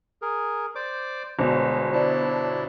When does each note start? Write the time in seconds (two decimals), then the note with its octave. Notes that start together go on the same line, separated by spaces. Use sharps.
0.22 G#4 A#4
0.75 C5 D5 D6
1.39 G1 B2 G#3 C5
1.93 D4 E4 C5 D5 A5